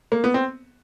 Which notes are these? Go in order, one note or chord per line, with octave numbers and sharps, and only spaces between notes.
A#3
B3
C4